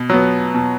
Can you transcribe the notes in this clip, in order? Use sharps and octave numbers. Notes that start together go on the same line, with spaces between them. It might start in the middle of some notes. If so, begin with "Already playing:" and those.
Already playing: B2
F#3 B3
B2